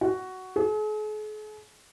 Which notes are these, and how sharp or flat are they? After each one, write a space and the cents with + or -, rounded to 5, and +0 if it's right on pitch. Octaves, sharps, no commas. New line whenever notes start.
F#4 +10
G#4 +45